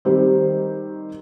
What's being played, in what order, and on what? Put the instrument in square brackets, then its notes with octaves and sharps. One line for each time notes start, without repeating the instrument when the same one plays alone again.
[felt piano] D#3 G3 C4 G4 C5